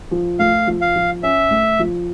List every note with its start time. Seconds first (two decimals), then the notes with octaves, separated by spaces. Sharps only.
0.11 F3
0.39 A3 F5
0.67 F3
0.81 F5
0.96 F3
1.23 C#4 E5
1.51 A3
1.79 F3